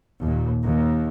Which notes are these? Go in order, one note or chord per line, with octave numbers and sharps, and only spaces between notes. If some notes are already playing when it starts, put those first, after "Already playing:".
D#2 A#2
D#2